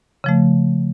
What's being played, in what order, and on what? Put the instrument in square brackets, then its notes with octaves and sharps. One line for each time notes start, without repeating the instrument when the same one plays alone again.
[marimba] C#3 F3 A3